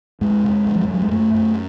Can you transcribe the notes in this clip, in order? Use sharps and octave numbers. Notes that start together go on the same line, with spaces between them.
F2 G#3
C3
F2
F3
F2 F#3
G3
G#3
F#2 A3
F#2